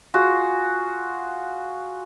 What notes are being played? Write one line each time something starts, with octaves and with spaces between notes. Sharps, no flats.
F4 F#4 G#4